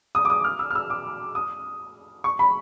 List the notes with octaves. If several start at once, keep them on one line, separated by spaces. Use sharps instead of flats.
D#6
D6
D#6
F6
E6
F6
E6
D6
D#6
C#6
B5